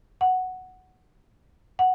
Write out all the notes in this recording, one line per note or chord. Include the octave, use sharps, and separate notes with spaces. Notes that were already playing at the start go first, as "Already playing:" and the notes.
F#5
F#5